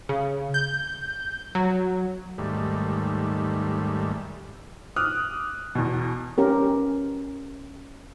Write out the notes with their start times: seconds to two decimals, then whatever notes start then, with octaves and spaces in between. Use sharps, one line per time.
0.09 C#3
0.54 G6
1.55 F#3
2.38 D#2 G#2 G3 A3
4.96 D6 D#6 F6 F#6
5.75 E2 B2
6.38 B3 C#4 G4 A#4